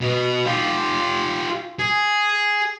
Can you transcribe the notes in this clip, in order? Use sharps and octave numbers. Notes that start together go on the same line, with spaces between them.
B2
F4 G4
G#4